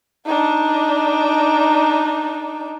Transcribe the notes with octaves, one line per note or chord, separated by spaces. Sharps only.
D4 D#4